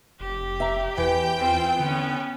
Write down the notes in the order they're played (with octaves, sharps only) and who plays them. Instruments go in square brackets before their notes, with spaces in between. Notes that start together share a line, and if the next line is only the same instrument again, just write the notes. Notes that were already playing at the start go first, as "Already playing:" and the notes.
[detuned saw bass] F1 [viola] G4
[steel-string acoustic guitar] E5 A#5
[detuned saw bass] E2 [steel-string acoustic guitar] E3 [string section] G5
[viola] C4 F4
[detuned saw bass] D3 [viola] B3 C#4